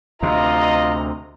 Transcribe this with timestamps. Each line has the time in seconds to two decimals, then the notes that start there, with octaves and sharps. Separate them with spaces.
0.22 D2 C3 F4 D#5 A#5